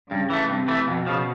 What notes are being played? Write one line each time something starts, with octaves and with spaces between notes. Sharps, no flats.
G2 C#3
E3 A3
G2 C3
E3 A3
F2 B2
C#3 F3